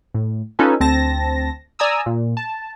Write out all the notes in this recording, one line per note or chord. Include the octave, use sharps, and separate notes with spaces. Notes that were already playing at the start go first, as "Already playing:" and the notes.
A2
C#4 D#4 F4 A4 B4 G#5
D2 C4 A5 A#6
D5 G#5 A#5 D#6 E6
A#2
A5